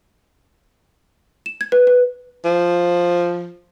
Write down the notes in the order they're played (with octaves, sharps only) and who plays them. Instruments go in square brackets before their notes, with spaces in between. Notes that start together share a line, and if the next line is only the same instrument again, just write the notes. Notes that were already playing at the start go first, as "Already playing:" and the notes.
[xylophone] E7
G#6
B4
B4
[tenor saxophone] F3